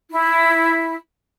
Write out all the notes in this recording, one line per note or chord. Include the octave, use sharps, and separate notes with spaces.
E4